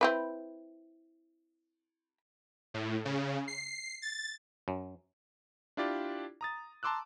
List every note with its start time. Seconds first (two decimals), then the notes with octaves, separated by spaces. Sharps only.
0.01 C4 E4 B4
2.74 A2
3.05 C#3
3.48 C7
4.02 A6
4.68 F#2
5.77 D4 E4 F4 G4 D5
6.41 A#5 D#6 A6
6.83 A5 A#5 C6 D6 E6 F#6